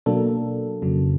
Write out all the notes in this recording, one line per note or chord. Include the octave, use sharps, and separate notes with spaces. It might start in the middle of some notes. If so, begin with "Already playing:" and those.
B2 F#3 A#3 D4 A4
F2 C#3 F#3